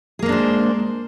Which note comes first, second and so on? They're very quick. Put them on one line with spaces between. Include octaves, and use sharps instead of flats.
G#4 A#3 G#3 D4 C5